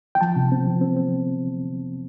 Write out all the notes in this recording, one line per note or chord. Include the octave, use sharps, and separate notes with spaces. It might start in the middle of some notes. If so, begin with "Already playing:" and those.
G5
F3 A5
C3
C4
F3
C4
C4